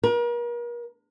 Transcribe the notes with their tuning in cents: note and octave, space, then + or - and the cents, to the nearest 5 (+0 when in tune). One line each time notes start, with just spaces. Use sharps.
A#4 +40